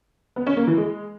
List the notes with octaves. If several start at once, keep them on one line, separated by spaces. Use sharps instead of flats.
B3
C#4
A#3
E3
G#3